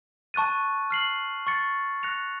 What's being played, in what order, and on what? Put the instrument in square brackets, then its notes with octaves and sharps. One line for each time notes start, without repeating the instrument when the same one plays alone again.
[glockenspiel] A5 C#6 F#6 A6 D#7
F6 C7 F#7
C#6 A6 C#7
F#6 A#6 C#7 F7